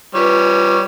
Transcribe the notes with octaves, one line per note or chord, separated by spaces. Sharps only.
G3 F4 B4 C#5